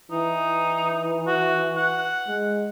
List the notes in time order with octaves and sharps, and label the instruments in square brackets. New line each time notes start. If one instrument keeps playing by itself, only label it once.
[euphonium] E3 [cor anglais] D#4
[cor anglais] F#4
F#5
[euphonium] G#3